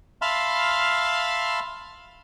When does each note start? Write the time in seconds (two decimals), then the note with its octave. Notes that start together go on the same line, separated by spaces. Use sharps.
0.22 E5 F5 A5 B5 C6 F6